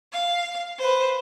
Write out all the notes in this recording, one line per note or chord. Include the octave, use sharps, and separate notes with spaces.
F5
B4 C5